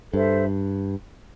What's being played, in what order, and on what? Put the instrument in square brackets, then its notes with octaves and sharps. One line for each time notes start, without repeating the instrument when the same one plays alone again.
[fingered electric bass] G2 [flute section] A4 C5 E5